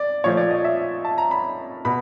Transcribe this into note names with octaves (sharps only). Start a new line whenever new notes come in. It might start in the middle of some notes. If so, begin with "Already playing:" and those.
Already playing: D5
A#2 F3 A3 C#5
D5
D#5
E5
A5
A#5
B5
B2 B5